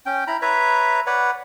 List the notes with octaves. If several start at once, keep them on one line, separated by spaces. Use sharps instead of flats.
C#4 G5
E4 A#5 B5
B4 C#5 E5 A#5
B4 C#5 D5 F#5